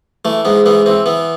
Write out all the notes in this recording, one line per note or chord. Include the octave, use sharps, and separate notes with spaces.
E3 A3
G#2 B3
E3 B3
E3 C4
E3 B3